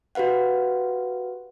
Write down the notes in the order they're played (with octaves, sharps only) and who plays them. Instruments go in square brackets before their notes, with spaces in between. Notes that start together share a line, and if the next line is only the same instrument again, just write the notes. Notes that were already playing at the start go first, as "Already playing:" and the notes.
[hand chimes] F#4 G4 B4 F5 F#5